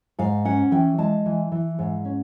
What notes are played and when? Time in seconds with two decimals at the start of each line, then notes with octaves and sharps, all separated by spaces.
0.19 G#2 F5
0.45 C#4 F#5
0.71 E3 G5
0.98 G#3 A5
1.26 E3
1.52 E3
1.79 G#2
2.05 C#4